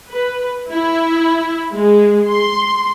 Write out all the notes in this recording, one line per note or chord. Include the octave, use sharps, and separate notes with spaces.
B4
E4
G#3
C6